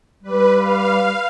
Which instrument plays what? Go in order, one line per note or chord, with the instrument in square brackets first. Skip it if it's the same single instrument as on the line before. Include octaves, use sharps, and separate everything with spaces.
[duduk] G3 [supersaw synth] B4
[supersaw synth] F5